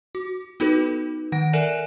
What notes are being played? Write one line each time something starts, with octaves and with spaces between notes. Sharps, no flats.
F#4
B3 D#4 F#4 A4 B4
D#3 F#5 A#6
A4 A#4 D5 E5 G#5